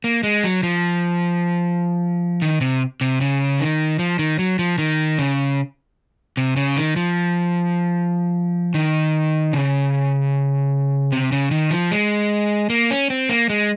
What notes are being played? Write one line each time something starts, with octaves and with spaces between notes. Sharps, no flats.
A#3
G#3
F#3
F3
D#3
C3
C3
C#3
D#3
F3
D#3
F#3
F3
D#3
C#3
C3
C#3
D#3
F3
D#3
C#3
C3
C#3
D#3
F3
G#3
A#3
C#4
C4
A#3
G#3